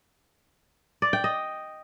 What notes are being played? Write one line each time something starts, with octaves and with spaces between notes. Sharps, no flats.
D5
G5
D#5